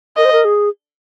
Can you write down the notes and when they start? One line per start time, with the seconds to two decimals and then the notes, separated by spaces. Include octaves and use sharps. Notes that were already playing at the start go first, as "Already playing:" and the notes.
0.17 A#4 D#5
0.25 C5
0.32 A#4
0.45 G#4